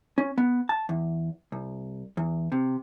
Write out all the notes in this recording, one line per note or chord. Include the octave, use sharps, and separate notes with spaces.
C#4
B3
A5
E2
C2
E2
C3